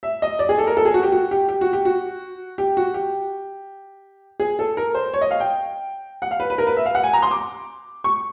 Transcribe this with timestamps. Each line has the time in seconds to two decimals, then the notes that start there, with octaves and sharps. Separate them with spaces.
0.03 E5
0.22 D#5
0.39 D5
0.49 G#4
0.58 A4
0.67 A#4
0.77 A4
0.85 G#4
0.94 F#4
1.03 G4
1.12 F#4
1.31 G4
1.48 G4
1.61 F#4
1.73 G4
1.85 F#4
2.58 G4
2.77 F#4
2.94 G4
4.40 G#4
4.59 A4
4.77 A#4
4.95 C5
5.13 C#5
5.21 D#5
5.31 F5
5.40 G5
6.22 F#5
6.31 F5
6.40 B4
6.50 B4
6.58 A#4
6.67 B4
6.77 E5
6.86 F5
6.95 F#5
7.03 G#5
7.13 A#5
7.22 C6
7.31 D6
8.04 C#6